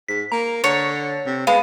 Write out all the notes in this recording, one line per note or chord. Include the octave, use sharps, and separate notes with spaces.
G#2 B6
A#3 A#5
D3 C#5 A6
C3
G#3 B3 F5